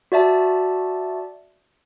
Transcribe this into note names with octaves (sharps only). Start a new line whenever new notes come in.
F#4 D5 E5 A5